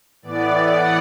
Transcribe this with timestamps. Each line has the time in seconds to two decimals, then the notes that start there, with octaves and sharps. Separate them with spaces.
0.22 A2 E3 B3 D5
0.70 F#5